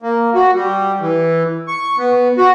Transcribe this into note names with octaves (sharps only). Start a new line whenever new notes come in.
A#3
F#4
G3
E3
C#6
B3
F#4